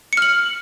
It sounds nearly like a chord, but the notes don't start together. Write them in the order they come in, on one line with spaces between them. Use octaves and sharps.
C#7 F6 F#7